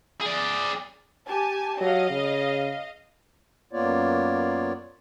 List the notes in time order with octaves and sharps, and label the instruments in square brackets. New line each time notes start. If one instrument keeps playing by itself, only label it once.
[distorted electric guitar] G#4 D5
[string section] G4 G#5 A5
[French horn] F#3 [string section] D#5 F5
[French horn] C#3
[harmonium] F#2 A#3 B3 F4 C#5 D5